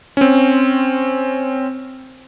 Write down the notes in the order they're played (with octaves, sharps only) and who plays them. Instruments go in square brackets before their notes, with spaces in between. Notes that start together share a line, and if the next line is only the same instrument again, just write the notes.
[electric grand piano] C4 C#4